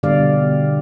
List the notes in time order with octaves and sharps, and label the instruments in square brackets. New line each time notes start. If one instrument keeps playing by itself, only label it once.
[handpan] B2 D3 G3 D5 F5